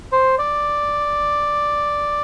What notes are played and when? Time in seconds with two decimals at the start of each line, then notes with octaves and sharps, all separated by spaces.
0.12 C5
0.39 D5